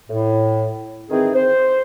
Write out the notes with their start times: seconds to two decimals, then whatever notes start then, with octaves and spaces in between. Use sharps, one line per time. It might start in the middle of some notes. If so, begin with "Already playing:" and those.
0.09 A2
1.09 D#3 E3 C4 G#4
1.34 C5